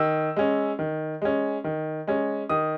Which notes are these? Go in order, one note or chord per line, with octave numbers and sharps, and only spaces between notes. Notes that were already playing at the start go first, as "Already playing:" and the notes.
Already playing: D#3 E6
G#3 C#4
D#3
G#3 C#4
D#3
G#3 C#4
D#3 D#6